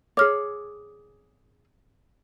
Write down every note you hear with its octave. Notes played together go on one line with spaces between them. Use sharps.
G#4 C#5 D6 F6